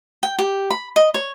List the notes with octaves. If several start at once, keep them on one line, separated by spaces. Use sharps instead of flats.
G5
G4
B5
D#5
C#5